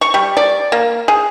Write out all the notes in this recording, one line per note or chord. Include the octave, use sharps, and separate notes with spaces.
C#6
G3
D5
A#3
G#4